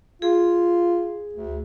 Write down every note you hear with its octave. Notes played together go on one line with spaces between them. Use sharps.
F4 G#4
D2